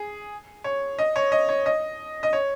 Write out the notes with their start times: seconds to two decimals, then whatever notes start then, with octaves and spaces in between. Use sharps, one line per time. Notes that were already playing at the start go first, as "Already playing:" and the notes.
Already playing: G#4
0.64 C#5
0.99 D#5
1.16 C#5
1.32 D#5
1.49 C#5
1.66 D#5
2.23 D#5
2.33 C#5